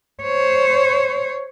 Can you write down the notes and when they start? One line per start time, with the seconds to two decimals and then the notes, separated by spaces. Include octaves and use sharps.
0.22 C5 C#5